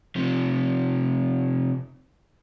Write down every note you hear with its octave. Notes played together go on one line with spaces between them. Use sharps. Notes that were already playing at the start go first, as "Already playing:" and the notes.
C3 F3